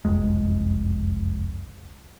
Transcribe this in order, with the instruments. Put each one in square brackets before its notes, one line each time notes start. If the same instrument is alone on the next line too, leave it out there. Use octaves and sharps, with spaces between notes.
[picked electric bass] F#1 C2 F2 G#3